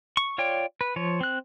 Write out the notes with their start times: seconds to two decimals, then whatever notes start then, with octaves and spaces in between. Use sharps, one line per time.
0.17 C#6
0.38 F4 C#5 D5 G5
0.81 B4
0.96 F3 C#5
1.21 C4 F#6